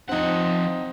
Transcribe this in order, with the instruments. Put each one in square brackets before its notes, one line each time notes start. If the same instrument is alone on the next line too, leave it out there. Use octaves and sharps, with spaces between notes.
[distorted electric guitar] F3 F#5 [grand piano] C4 D#4